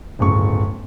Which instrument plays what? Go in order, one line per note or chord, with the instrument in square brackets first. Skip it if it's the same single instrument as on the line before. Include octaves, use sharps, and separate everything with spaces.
[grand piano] D1 G1 C#3 C#6